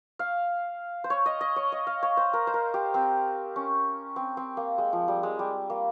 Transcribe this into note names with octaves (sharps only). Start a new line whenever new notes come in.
F5
C5
C#5
D#5
D#5
C#5
D#5
F5
C#5
C5
A#4
C5
A#4
G4
C4
C#4
C4
C4
A#3
G#3
F3
G3
G#3
G3
A#3